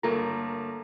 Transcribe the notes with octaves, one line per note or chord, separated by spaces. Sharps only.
G1 A3 A#3 A#4 A#5